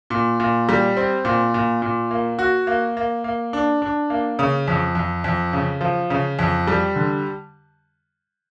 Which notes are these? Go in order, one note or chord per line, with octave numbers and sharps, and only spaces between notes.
A#2
A#2
G3
C4
A#2
A#2
A#2
A#3
F#4
A#3
A#3
A#3
D4
D4
A#3
C#3
F2
F2
F2
C#3
F3
C#3
F2
G3
D3